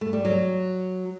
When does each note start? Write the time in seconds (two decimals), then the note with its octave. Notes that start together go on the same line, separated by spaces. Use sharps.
0.01 A3
0.13 G3
0.25 F#3